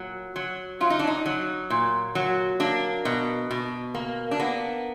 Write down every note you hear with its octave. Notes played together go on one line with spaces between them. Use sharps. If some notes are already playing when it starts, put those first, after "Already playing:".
Already playing: A#2 F#3
F#3
F#3 F4
D#4
D4
D#4
F#3
A#2
F#3
A#3 D4
B2
B2
A#3
D4
A#3 B3